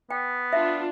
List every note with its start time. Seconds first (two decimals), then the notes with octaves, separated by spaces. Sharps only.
0.10 B3 G5
0.53 D4 F4 E5